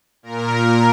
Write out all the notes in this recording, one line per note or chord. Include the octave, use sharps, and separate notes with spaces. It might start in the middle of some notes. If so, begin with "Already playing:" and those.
A#2 A#4